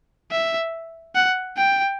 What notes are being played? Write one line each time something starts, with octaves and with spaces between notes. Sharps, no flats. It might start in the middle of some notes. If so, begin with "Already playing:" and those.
E5
F#5
G5